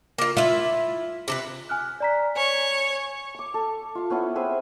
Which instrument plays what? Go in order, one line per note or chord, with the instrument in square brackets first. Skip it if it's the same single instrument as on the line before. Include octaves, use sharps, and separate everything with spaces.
[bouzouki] A#3 F4
[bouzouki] E4 E5 [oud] F4
[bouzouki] C3 A4 B4
[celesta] G#5 F6 F#6
D5 A#5 B6
[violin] C#5 [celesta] G#5
[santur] C#6 D6
A4
F4 F5
B3 C#4 E4 F#5
C4 G#4 B4 E5